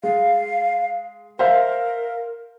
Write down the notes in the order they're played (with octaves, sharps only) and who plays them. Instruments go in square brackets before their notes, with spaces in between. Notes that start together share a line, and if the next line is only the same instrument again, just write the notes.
[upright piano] G#3 [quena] F5
[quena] A#4 [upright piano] C5 E5 F5